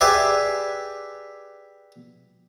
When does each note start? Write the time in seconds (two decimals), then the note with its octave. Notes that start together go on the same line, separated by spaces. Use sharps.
0.01 G4 G#4 B4 D5 E5